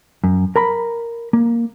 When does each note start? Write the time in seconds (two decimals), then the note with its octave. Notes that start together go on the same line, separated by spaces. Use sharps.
0.24 F#2
0.56 A#4 A#5 B5
1.33 A#3